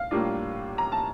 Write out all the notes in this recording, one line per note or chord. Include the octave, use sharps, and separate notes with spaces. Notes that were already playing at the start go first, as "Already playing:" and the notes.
Already playing: F5
A2 G3 A#3 D4 F4
A#5
A5